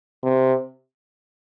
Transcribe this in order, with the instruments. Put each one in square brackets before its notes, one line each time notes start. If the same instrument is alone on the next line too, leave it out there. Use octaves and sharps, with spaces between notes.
[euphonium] C3